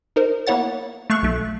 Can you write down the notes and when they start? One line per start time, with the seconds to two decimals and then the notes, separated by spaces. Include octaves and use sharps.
0.16 D#4 A#4 C5
0.47 A#3 B3 E4 C#5 F#5 A6
1.10 A3 F5 C#6 F#6
1.22 B1 A3